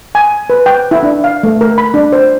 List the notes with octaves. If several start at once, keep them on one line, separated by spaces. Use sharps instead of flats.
G#5
B4
G5
E4
D4
F5
A3
A#4
B5
D4
C5